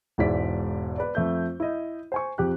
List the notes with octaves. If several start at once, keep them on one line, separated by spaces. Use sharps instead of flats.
E1 G#2 E4 D5 B6
B4 D5
F2 A3 G6
E4 D#5
C5 G#5 C#6
F2 G4 F#6